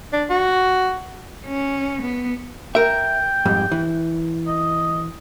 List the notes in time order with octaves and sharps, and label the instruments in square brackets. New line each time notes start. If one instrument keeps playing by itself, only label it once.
[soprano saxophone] D4
F#4
[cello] C#4
B3
[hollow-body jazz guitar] A#4 E5 [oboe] G5
[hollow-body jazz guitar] F2 G#2 G3
E3
[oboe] D#5